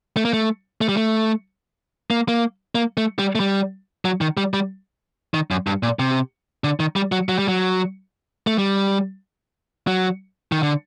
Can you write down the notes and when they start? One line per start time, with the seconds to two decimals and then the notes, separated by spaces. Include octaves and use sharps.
0.17 A3
0.25 A#3
0.33 A3
0.81 A3
0.89 G3
0.97 A3
2.10 A#3
2.28 A#3
2.75 A#3
2.97 A3
3.19 G3
3.35 A3
3.40 G3
4.05 F#3
4.21 D#3
4.37 G3
4.54 G3
5.34 D#3
5.51 F#2
5.67 G2
5.83 A#2
5.99 C3
6.64 D3
6.80 D#3
6.96 G3
7.12 F#3
7.29 F#3
7.39 G3
7.48 F#3
8.47 A3
8.58 G3
9.87 F#3
10.52 D#3
10.63 D3